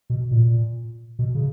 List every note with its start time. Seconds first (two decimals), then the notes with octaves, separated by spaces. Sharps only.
0.10 B2
0.31 A#2
1.19 B2
1.35 C#3